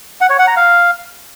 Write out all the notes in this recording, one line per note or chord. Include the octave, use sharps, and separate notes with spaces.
F#5
C#5
F#5
A#5
F5